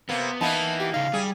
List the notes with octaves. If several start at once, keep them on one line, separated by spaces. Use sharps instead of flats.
C3 A#3 B3
E3 A#3 B3 D#4 E4 A5
G4
C#3 D#4 F5
G3 G#4